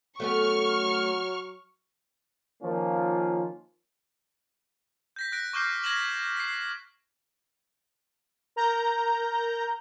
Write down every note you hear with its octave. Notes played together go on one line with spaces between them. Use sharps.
F#3 A3 B3 C#4 C#6 F6
D#3 F3 A#3 C#4 F4
G6 A#6 B6
F#6 A#6 D7
C#6 D6 F6 G6 C7
G#6 A#6 B6 E7 F#7 G7
B6 C7
A#4 A#5 G6